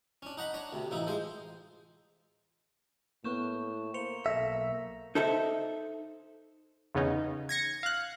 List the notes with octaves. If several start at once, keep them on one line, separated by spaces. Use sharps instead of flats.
C#4 D4
D#4 F#5 A#5 B5
D4 C#5 A#5
D2 C3
A1 F3 D#4 E4
F3 G#3 C5
A2 A#3 B3 C#6 G6 E7
A#3 C5 C#7 F7
B1 A4 E5 A#6
D#4 A4 C5 E5
E2 C#3 B3 C#4 D#4
G#6 A#6 C#7
F5 F#6